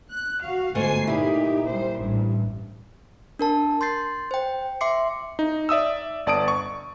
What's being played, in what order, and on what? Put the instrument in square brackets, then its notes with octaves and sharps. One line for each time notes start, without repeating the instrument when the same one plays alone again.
[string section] F#6
F#4 F5
[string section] G1 G#5 C7 [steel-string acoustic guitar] G#2 A3 C5
[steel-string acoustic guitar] A#2 E4 [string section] D#4 G4
[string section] G3 C5
A1 G2
[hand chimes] D4 A#4 A5
C6 G6 A6 C7
C5 G5
E5 C6 D6 C7 C#7
[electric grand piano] D#4
D5 E5 D#6 E6
G1 D5 A5 D#6 D7
C#6